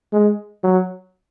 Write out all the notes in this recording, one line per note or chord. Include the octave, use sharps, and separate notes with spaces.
G#3
F#3